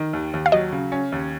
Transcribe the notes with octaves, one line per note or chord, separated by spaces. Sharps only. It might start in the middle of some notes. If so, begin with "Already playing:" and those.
Already playing: D#3
D#2
D#2
F5
F#3 D#5
C#3
C#4
D#2